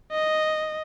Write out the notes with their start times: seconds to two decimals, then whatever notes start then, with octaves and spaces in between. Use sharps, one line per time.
0.12 D#5